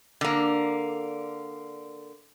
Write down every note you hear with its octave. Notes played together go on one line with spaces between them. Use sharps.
D3 A#3